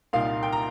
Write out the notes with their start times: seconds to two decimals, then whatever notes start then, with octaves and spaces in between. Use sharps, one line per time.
0.13 C2 A#2 A#3 D#4 F5
0.43 G5
0.52 A#5